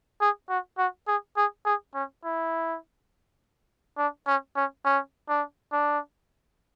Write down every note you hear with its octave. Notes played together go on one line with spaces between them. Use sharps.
G#4
F#4
F#4
G#4
G#4
G#4
C#4
E4
D4
C#4
C#4
C#4
D4
D4